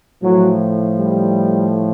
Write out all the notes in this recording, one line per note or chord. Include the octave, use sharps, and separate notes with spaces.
A2 F3 F#3
G3